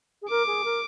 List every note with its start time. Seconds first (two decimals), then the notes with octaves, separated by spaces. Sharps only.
0.22 G#4
0.29 A#4 D6
0.46 G#4
0.64 A#4